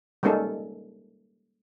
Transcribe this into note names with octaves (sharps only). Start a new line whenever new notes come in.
G3 G#3 A#3 C#4 D#4 A4